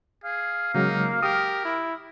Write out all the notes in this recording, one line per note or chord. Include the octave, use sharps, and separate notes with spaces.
G#4 F5
C#3 F#3 G#3 A#3 D#4
G4 A#4 D#6
E4